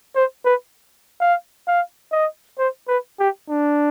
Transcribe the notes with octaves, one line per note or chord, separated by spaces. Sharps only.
C5
B4
F5
F5
D#5
C5
B4
G4
D4